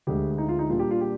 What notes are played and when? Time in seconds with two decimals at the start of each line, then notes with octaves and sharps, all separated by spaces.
0.07 D2 D3 G#3 G4
0.38 D#4
0.49 F4
0.59 D#4
0.69 A#2 G3 D4 F4
0.80 G4
0.91 F4
1.01 G4